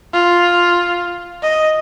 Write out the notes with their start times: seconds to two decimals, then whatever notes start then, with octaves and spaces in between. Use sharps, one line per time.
0.13 F4
1.42 D#5